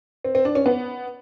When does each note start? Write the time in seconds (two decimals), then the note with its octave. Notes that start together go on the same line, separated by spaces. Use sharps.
0.24 C4
0.35 C4
0.45 D4
0.55 C#4
0.66 B3